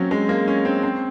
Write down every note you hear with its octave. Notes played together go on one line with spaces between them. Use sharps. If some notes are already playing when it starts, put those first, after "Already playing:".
Already playing: F#3 A#3 C4 C#4
G#3
A#3
C#4
C4
C4